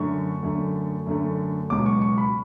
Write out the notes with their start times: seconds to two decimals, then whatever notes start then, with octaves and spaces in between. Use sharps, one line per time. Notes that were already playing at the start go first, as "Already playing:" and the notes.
Already playing: F#2 D3 A3 C#6
0.43 F#2 D3 A3
1.06 F#2 D3 A3
1.70 C#2 B2 F#3 D6
1.86 C#6
2.02 C#6
2.18 B5